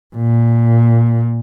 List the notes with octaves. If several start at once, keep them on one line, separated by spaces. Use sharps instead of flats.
A#2